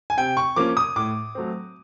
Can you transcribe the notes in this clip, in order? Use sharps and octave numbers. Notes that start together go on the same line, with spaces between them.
G#5
C3 G5
C#6
F3 A#3 C#4 D6
D#6
A2 D6
F#3 A3 C4